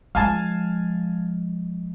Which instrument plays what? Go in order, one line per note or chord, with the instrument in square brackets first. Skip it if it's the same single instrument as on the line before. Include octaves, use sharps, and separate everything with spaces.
[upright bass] F3 G#3 [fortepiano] F5 G#5 A5